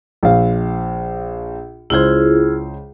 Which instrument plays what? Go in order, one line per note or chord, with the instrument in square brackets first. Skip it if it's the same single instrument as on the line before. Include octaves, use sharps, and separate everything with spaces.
[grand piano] A#1 F5
[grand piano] C#2 C5 [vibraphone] E4 F4 G#4